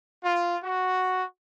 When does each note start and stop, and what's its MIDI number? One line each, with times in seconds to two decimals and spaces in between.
0.24 0.58 65
0.64 1.24 66